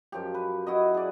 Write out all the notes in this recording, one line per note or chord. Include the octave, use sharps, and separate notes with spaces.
F#2 F3 G4
B4
E4 F#4 B4 D#5
G#4 D5